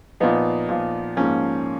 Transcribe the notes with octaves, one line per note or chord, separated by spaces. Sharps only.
A#2 F3 B3 D#4
A#2 F3
G#2 F3 A#3 C#4